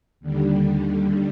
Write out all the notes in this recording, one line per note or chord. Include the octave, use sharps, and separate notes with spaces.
D#2 D3 G3